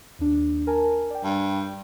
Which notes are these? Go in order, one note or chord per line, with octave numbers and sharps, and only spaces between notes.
D#2 D4
A#4 G#5 A5
D5 G5
G2